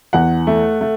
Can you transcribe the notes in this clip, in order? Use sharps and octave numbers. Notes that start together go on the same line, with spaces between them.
E2 F#5
A3
A3